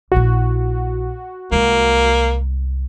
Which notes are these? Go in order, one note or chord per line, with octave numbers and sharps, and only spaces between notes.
A#1 E4 F#4
C2 G#3 A#3